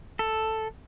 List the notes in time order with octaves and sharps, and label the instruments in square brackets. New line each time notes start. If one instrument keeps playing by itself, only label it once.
[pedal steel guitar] A4